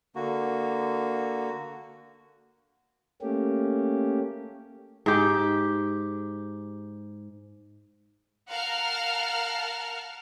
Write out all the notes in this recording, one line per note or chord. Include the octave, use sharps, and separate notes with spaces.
D3 A#3 F#4
A3 A#3 C#4 G4
G#2 G4
A#4 F5 F#5 A5 A#5 F6